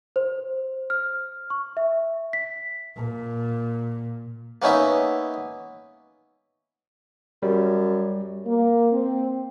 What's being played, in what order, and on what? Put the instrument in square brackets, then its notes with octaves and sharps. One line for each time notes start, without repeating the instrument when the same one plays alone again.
[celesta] C5
F6
C#6
E5
B6
[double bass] A#2
[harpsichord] A#3 B3 C#4 D#4 E5
[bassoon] F#2 [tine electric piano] G3
[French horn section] A#3
C4